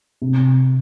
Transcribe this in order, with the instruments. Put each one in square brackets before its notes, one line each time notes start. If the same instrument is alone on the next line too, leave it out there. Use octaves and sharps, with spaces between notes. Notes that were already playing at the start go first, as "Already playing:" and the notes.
[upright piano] C3